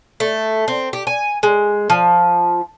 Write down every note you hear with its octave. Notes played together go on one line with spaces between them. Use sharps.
A3
C4
G4
G#5
G#3
F3